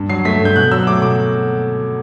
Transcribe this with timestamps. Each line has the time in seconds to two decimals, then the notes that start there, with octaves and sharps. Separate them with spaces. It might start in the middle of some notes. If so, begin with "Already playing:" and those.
Already playing: G2
0.09 F#3 C7
0.25 A3 B6
0.41 G2 G6
0.56 B2 F#6
0.71 F#3 E6
0.87 A3 D6
1.02 B2 D6